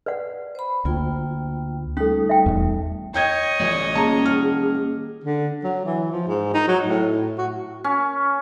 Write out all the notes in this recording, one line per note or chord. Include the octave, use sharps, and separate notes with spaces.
B4 D5 F#5
C5 B5
D2 A#3 F4 G5
G3 A3 C#4 D#4 A4
E5 G5
D#1 G#1 E2
C#5 D#5 G5 G6 G#6
A1 A3 F4 D5
D#3 A#3 C#4 G#4 A5 A#5
F6
D3
F#3
E3
F3
G#2
D#4
F#3
A2
F#4
C#4